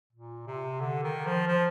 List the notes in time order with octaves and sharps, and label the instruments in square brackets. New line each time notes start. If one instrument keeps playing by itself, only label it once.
[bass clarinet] A#2
C3
D3
D#3
F3
F3